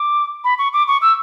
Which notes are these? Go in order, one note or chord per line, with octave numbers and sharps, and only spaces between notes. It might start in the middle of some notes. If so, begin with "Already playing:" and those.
Already playing: D6
B5
C#6
D6
C#6
E6